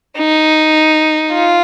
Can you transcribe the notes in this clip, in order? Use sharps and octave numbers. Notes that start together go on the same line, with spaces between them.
D#4
F4